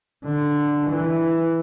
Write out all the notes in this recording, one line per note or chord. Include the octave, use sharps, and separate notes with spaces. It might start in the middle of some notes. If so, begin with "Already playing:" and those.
D3
E3